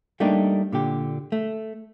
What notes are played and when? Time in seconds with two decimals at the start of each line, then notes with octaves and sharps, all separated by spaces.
0.20 G3 A3 A#3 D4 D#4 G4
0.72 A#2 D3 G4
1.32 A3